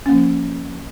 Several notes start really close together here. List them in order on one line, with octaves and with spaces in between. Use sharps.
C#4 A#3 F3